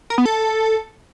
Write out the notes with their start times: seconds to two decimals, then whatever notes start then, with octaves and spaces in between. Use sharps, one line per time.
0.10 A#4
0.18 B3
0.25 A4